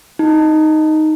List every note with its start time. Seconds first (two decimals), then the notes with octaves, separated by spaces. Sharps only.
0.19 D#4